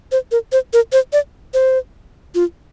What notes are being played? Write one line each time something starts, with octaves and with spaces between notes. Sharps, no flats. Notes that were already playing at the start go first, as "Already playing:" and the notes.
C5
A#4
C5
A#4
C5
D5
C5
F4